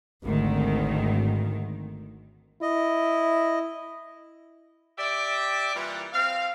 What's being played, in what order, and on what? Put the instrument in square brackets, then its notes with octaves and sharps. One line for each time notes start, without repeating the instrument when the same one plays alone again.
[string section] G#1 D2 D#3
[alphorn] E4 [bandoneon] D#5
[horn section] G4 D5 E5
A#2 E3 G3
C4 F5